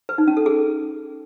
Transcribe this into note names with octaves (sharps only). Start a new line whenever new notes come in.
B4
D#4
C#4
A4
G#4